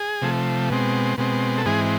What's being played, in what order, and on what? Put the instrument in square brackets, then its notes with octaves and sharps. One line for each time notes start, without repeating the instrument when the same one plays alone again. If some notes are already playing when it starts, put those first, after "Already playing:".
Already playing: [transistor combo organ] G#4
C3 F3 A3
B2 G#3 C4
B2 G#3 C4
A4
G#2 E3 G#3 C4 G#4